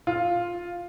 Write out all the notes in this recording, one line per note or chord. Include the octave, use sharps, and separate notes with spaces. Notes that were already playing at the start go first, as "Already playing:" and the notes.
F4